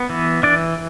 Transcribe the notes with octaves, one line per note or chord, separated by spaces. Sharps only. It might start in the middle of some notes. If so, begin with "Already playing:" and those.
Already playing: B3
E3
E3 D4 D5